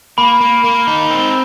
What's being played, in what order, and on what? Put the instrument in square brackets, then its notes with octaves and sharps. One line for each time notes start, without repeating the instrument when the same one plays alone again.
[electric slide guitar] A#3 [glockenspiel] B5
[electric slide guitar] A#3
A#3
D#4
C4